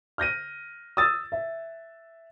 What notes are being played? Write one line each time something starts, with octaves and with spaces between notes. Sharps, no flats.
F6 G6 A#6 D#7
D#6 E6 A6
E5